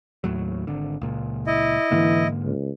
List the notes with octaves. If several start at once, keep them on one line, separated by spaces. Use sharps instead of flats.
D#2 A2 F#3
G#1 D3
C#2 A#2
E4 D#5
G#2 D3 E3 A#3
C#2